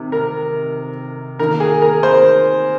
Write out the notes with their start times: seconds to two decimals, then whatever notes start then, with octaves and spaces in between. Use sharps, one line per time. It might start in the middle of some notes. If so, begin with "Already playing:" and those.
Already playing: C3 D#3
0.12 A#4
1.39 D#3 A#3 A#4
1.60 G#4
1.82 A#4
2.03 C5